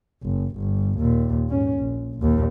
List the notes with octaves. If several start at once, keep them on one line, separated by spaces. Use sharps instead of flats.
F#1
G1
D#2 A#2
G#2 C#4
A#1
A#1 D#2